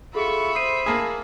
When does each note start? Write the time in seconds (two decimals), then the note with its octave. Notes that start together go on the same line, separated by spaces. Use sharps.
0.15 F4 F#4 G#4 A4 E5 B5 C#6
0.55 C5 D#6 C7 D#7
0.86 A#3 F4 G#4 A5